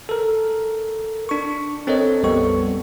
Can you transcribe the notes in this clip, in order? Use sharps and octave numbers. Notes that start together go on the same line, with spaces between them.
A4 A#4
D4 C#6
C4 A4 A#4 C#5 D#5
A#1 F2 G3 B3 A4 C#6